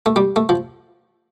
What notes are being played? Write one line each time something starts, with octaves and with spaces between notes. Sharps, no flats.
A3
G3
A3
F3